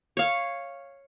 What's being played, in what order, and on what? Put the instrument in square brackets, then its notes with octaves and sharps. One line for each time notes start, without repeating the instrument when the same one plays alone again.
[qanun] C#5 F5